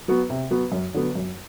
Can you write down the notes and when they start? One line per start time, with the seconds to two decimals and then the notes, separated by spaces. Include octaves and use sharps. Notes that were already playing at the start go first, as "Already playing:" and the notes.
0.08 F#3 B3 F#4
0.30 C3
0.51 F#3 B3 F#4
0.72 F#2
0.94 D3 F#3 B3
1.15 F#2